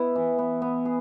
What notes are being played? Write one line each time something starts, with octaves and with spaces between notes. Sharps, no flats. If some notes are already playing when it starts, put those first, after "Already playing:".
Already playing: B3 E4
E3
B3
B3
G#4